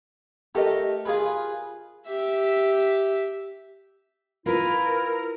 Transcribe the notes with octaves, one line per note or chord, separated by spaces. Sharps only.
A3 G4 A#4 D#5
F4 G#4 B4
G4 E5
E4 F4 A#4 B4